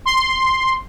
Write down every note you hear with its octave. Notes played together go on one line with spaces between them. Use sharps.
C6